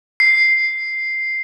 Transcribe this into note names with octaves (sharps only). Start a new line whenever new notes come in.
C7